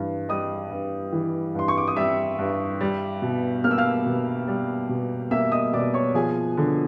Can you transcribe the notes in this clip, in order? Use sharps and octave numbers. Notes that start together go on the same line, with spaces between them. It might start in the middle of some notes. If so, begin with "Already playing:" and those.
Already playing: G2 E3
G3 D#5 D#6
G2
E3
G2 C6
C#6
D6
D#6
G3 E5 E6
G2
G3
B2
A#3 F6
E6
F5 F6
B2
G3
B2
A#3 E5 E6
D#5 D#6
B2 D5 D6
C#5 C#6
F3 G#4 G#5
D3